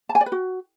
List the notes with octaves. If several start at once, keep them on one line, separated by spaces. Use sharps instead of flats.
A5
G#5
D5
B4
F#4